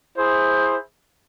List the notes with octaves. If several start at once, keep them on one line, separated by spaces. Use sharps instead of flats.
E4 G#4 C5